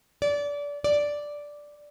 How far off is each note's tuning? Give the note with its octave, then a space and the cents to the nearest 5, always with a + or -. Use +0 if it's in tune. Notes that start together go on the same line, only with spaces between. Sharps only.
D5 -25
D5 +0